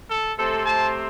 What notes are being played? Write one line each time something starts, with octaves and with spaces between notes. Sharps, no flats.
A4
C3 A3 C4 A4
A5